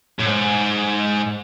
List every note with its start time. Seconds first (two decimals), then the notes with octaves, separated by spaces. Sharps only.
0.19 A2
0.26 G#2